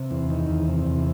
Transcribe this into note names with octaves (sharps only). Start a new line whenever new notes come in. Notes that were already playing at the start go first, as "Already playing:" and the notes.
Already playing: C3
E2
D#3
E2
C3
E2